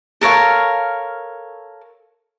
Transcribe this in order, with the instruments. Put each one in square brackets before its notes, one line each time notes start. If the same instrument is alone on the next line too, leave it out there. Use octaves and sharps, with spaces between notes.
[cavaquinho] A4 A#4 C#5 F5